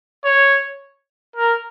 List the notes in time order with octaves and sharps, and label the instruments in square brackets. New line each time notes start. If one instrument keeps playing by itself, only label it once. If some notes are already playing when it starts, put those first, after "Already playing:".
[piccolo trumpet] C#5
A#4